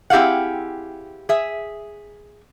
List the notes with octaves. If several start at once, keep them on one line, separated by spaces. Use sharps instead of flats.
C4 E4 G4 G#4 F5 F#5
G#4 E5